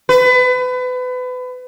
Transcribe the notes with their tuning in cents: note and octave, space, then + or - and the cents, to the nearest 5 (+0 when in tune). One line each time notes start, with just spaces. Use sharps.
B4 +30